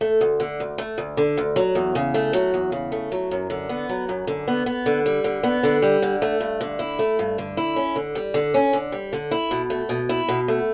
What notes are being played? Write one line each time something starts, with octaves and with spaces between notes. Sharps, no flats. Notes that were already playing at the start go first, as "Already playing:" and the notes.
A3
D2
D3
D2
A3
D2
D3
D2
F#3
E2
C#3
A3
F#3
E2
C#3
A3
F#3
F#2
D3
B3
F#3
F#2
D3
B3
B3
D3
G3
D3
B3
D3
G3
D3
A3
G2
D3
E4
A3
G2
D3
E4
C#4
D3
G3
D3
C#4
D3
G3
D3
E4
B2
A3
B2
E4
B2
A3